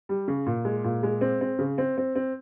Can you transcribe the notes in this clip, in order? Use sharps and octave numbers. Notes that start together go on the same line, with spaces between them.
G3
C#3
A#2
G#3
A#2
G#3
C4
C4
C#3
C4
C4
C4